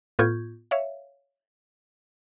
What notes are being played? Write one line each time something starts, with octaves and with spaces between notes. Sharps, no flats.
A2 B3 F4 C#6 G6 G#6
C#5 E5 F5